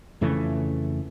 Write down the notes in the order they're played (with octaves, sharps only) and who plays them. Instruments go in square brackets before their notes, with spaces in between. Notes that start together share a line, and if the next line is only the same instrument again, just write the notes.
[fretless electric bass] F2 C#3 E3 A3